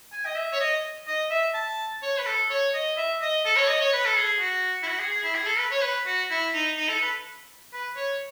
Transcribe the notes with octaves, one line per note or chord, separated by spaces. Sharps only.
G#5
D#5
E5
C#5
D#5
D#5
E5
A5
C#5
B4
A4
C#5
D#5
E5
D#5
A4
C#5
D#5
C#5
B4
A4
G#4
F#4
E4
F#4
G#4
G#4
E4
G#4
A4
B4
C#5
B4
F#4
E4
D#4
D#4
A4
B4
B4
C#5